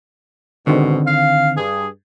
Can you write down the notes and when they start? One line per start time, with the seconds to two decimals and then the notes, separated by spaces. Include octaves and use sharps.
0.67 G#2 B2 D3 D#3 C4
1.06 F5
1.57 G2 G#4